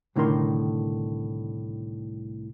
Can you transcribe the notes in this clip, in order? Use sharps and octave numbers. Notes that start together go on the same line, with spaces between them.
C2 A2 D3 D#3 A#4 C6